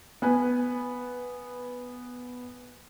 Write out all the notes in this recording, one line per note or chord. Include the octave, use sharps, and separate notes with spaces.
B3 B4 G#5